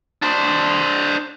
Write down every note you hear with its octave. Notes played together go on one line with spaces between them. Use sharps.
D4 C5